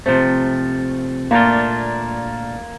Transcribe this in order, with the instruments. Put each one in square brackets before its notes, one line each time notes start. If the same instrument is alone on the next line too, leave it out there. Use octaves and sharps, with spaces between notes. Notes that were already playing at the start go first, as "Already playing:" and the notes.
[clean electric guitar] C3 F3 A3 [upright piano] C4
[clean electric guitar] A#2 A3 D4 F4 [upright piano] A#3